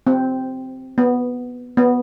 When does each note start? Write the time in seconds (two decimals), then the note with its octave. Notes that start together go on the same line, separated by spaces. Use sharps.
0.07 C4
0.98 B3
1.77 B3